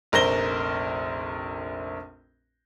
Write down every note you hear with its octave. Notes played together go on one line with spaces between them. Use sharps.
F1 A#1 A#4 C5 A#6 G7